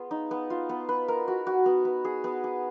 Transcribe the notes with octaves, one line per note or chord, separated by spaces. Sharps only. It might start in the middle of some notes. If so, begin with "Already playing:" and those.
Already playing: B3 F4 G#4
D#4
B3
F4
B3
B4
A#4
F#4
F#4
B3
B3
G#4
B3
G#4